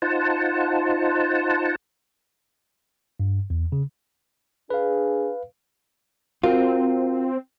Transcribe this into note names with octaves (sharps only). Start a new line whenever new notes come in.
D#4 F4 C5 F#5 A5
G2
E2
C#3
D4 G#4 B4 F5
C4 F4 F#4 A#4